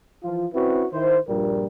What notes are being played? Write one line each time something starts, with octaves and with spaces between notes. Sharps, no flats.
E3 F3 F4
C4 C#4 E4 F#4 B4
D#3 E4 C5
A#1 G2 A#2 G3 A#4